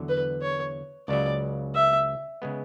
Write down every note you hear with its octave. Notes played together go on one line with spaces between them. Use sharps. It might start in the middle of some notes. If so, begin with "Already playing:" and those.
Already playing: E2 D3 F#3
B4
C#5
C#2 C#3 F#3 D5
E5
C#3 G#3 B3